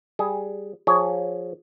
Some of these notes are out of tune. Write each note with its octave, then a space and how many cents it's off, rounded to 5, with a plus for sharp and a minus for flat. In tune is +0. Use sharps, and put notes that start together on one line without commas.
G3 +0 G#4 +10
F3 +25 G#4 +0 C#5 +20